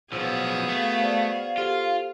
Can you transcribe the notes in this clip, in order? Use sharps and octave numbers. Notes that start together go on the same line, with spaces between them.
B1 F3 B3 F#4 G#4 E6
A3 F5
C5 D5
F4 G4 A4 C5